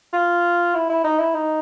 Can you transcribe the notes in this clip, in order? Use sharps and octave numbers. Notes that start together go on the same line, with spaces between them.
F4
E4
E4
D#4
E4
D#4